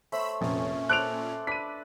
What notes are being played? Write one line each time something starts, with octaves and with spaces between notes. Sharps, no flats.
A3 C5 C#5 E5 B5 E6
F1 A#2 C#4
A4 C5 D5 F#6 D7 F7
D4 B4 D5 B6 D#7